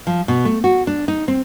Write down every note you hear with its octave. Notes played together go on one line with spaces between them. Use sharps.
F3
B2
A3
F#4
D4
D#4
C4